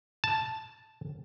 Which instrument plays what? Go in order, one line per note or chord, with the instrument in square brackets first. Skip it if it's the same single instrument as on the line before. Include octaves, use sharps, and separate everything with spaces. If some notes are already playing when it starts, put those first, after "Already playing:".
[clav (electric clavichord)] A5